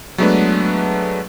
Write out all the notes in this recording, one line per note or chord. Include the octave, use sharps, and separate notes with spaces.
F#3 G#3 A3 B3 D4 B4